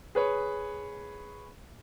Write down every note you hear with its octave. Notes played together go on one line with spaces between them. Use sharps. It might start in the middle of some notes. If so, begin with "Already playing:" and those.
G#4 B4 C#5